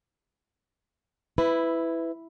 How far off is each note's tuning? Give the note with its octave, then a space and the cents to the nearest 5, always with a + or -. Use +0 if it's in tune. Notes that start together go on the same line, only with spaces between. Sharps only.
E4 +0 B4 +20